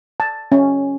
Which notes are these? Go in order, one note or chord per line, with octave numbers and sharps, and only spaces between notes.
A5
C#4